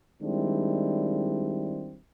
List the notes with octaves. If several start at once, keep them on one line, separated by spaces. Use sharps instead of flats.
D#3 G3 G#3 C4 D4 E4